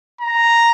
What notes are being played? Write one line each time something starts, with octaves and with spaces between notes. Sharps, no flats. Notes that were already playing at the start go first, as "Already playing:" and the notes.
A#5